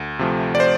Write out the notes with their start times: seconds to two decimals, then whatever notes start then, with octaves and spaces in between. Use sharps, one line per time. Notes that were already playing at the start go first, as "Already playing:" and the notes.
Already playing: D2
0.19 C3 F3 A3
0.55 D5
0.60 C5